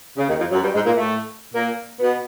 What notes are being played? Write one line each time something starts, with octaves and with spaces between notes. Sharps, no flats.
C#3
D#2 D#3
F2 F3
F#2 F#3
G2 G3
G#2 G#3
A#2 A#3
A2 A3
A#2 A#3
B2 B3